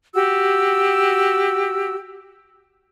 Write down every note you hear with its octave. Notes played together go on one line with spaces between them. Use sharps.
F#4 G4 E6